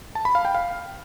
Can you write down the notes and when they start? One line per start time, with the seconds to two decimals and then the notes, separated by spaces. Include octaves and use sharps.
0.15 A5
0.25 B5
0.35 F5
0.45 G5
0.55 F5